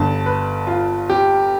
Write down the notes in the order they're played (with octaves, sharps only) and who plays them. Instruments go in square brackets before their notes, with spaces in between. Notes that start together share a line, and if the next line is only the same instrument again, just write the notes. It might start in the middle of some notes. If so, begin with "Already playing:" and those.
Already playing: [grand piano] G1 G2 D3 A5
B4
F4
G4